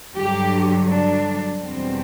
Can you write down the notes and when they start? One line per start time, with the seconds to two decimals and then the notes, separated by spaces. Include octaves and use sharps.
0.15 G2 D3 F#3 G4
0.90 D4
1.63 E2 B2 G3 C4